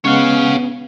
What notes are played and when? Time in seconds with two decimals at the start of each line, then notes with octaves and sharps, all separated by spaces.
0.05 C#3 G#3 B3 C#4 C#5 F5 F#5